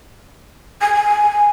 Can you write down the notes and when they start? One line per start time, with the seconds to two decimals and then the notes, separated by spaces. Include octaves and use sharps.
0.82 G#5
0.95 G#5